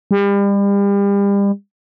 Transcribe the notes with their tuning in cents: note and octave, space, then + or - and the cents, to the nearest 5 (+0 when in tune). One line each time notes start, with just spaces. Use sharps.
G3 +35